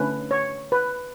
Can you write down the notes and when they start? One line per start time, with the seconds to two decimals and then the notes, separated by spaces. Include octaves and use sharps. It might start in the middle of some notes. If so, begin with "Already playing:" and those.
Already playing: D3 A3 C#4 B4
0.31 C#5
0.72 B4